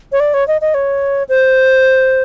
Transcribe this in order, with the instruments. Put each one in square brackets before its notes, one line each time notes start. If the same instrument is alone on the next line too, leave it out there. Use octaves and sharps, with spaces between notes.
[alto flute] C#5
D5
C#5
D#5
D#5
C#5
C5